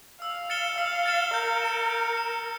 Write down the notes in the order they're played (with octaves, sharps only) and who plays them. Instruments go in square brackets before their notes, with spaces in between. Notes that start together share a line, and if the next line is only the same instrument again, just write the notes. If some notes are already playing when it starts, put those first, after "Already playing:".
[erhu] F5 [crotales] E6
[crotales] A6 C#7 E7 G7
[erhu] F5 [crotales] E6
[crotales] A6 C#7 E7 G7
[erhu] A#4 [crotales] G6
[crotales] C#7 E7
G6
C#7 E7